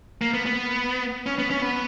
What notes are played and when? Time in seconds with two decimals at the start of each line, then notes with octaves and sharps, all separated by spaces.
0.21 A#3
0.34 B3
0.46 B3
1.26 C#4
1.39 B3
1.50 C#4
1.62 B3